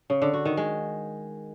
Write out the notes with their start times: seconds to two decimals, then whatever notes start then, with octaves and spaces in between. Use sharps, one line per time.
0.10 C#3
0.22 D3
0.34 F#4
0.45 D#3
0.57 G#3